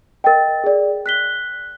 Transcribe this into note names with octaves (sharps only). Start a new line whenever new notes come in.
A#4 D#5 G5 A6
G#4 D5
F#6 B6 G7